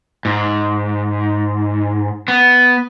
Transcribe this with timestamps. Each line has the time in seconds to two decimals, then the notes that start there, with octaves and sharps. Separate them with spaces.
0.25 G#2
2.28 B3